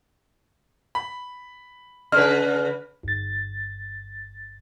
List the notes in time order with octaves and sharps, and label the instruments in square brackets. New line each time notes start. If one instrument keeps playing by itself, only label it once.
[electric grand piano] B5
[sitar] C#3 B4 [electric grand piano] F6
[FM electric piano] G1 A6